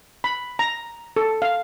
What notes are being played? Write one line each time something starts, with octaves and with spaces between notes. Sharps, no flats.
B5
A#5
A4
F5